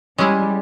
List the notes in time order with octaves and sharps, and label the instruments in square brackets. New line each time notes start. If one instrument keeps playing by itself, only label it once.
[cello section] G3 [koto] G#3 C#4 E4 G#4